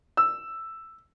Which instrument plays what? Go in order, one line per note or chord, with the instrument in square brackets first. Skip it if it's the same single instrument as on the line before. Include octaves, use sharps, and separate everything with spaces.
[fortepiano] E6